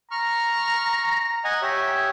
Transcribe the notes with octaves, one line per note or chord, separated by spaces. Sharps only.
A#5 C#6 F6
D#5 F#5 G#5
G4 C#5 E5